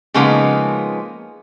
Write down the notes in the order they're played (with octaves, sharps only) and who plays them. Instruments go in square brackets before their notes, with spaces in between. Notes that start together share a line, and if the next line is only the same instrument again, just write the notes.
[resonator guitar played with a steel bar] C#3 F3 G#3 A#3 B3 D#4